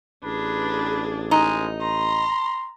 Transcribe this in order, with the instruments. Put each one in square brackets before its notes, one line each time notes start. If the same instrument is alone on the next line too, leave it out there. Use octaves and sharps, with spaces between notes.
[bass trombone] A1 [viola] D4 G#4 [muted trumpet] B4
[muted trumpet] G#3 [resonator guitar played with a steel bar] D#4
[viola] A#5 [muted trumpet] C6